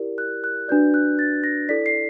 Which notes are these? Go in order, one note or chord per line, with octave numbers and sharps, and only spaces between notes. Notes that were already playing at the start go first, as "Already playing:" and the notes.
Already playing: E4 G4 A#4 D5
F#6
F#6
D4 F#4 B4 D5 G6
F#6
A6
A#6
E4 A4 D5 B6
C7